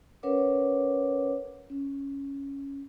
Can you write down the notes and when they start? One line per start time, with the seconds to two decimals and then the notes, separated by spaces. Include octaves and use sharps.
0.23 C#4 A#4 B4 C#5 F#5 D6
1.70 C#4